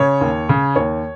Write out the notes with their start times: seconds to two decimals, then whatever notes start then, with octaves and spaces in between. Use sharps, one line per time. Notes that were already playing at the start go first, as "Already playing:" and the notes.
Already playing: C#3 C#5
0.21 D#2
0.49 C#3
0.76 D#2 C#5